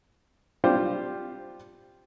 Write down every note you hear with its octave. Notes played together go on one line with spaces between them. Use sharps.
G3 C4 D4 F4 G4 C5